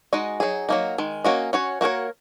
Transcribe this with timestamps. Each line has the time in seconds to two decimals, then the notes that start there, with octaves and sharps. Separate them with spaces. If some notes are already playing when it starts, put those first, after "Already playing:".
0.13 G#3 D#4 F#4 D#5
0.40 F#3 D#4 G#4
0.69 F#3 A#3 D#4
0.98 D#3 G#3
1.24 A#3 C#4 F#4 D#5
1.53 C#4 F#4 C#5
1.81 A#3 F#4 A#4 C#5